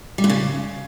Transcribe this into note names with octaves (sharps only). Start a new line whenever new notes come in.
G3
A#2
C#3